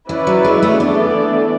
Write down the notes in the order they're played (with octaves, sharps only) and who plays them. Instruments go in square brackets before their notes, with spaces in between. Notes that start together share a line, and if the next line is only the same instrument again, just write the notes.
[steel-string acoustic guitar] E3 [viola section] C#4 E4 B4 D5
[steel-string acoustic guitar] F#3
G#3
A3
[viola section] E3 B3 D4 A4 D5 [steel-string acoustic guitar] A3